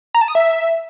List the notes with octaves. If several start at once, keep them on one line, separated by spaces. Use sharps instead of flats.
A#5
A5
D#6
E5